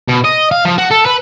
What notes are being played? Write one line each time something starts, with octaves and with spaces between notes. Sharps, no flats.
B2
D#5
F5
F3
F#4
A4
B4